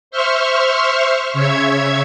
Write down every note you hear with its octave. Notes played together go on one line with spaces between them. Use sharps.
C5 E5 C6 C#6 F6
C#3 C#5 E5 G#6